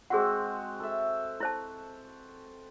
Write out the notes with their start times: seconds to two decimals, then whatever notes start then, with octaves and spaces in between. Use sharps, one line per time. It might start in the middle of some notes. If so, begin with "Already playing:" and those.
0.10 G#3 C4 F#4 G#4 F#5
0.80 A4 E5
1.40 E4 C5 A5